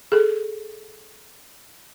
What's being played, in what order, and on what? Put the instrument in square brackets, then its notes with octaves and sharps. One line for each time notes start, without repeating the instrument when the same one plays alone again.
[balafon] G#4 A4